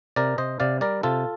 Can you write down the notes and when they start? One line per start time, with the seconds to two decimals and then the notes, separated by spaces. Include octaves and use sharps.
0.16 C3 A#4 D5
0.38 C3 C5 D#5
0.60 C3 D5 F5
0.81 G3 A#4 D5
1.03 C3 F4 A4